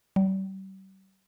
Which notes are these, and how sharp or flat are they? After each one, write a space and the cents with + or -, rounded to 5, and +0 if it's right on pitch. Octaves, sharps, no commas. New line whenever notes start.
G3 -40